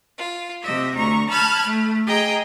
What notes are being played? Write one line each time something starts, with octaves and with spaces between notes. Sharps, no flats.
F4
C3 D#5 E5
D2 A#5 C#6
A5 B5 F6 F#6 G#6
A3
G#4 D#5 G5 A#5